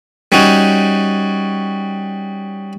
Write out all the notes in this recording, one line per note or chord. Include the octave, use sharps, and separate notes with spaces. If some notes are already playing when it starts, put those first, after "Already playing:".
G3 C#4 D#4 F#4